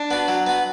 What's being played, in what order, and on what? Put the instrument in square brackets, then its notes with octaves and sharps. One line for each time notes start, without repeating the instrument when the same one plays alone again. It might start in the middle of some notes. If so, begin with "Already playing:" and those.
Already playing: [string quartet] D4
[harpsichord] B3 F#4
F#3
B3 F#4